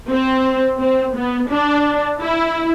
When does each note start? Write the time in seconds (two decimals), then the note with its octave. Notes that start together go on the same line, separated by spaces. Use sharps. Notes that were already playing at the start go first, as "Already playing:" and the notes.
0.11 C4
0.80 C4
1.15 B3
1.50 D4
2.20 E4